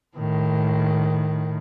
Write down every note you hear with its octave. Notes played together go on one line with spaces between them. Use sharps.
A2 D#3